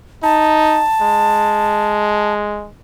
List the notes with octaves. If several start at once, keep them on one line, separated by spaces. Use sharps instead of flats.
D#4 A5
G#3